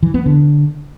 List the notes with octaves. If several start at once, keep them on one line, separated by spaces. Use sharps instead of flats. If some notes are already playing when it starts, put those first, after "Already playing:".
E3
B3
D3